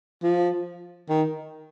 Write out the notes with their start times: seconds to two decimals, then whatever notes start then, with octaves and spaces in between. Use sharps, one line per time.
0.23 F3
1.09 D#3